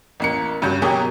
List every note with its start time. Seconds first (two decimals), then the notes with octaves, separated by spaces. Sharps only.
0.20 A1 A#3 C#7
0.62 G2 C#3 F#4 G6
0.82 B2 F#3 A#3 G4 G#4